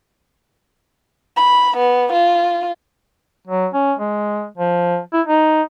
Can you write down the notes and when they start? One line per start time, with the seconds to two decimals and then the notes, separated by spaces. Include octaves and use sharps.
1.37 B5
1.77 B3
2.12 F4
3.47 F#3
3.73 C#4
3.99 G#3
4.57 F3
5.13 E4
5.27 D#4